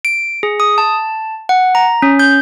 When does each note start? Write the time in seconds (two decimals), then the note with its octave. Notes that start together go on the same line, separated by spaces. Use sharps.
0.05 D7
0.43 G#4
0.60 D#6
0.78 A5
1.49 F#5
1.75 A#5
2.02 C#4
2.19 G6